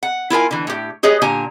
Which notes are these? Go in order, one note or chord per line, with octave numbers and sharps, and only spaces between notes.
F#5
E4 F4 A#4 G#5
D3 E3
A2 G4
G4 G#4 B4 C#5 D#5
A#2 D3 G4 G#5 A#5